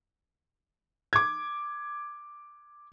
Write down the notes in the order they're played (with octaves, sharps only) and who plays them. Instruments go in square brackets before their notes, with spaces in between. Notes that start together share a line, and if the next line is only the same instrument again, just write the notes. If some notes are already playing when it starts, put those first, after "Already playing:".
[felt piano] D6 G#6